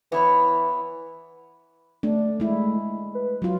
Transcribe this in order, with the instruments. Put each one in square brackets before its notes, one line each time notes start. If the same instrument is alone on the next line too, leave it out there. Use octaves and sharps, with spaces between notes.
[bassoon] E3 [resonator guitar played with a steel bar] B3 E4 C#5
[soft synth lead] A3 [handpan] D4
[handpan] G#3 E4
[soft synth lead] B4
[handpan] F#3 F4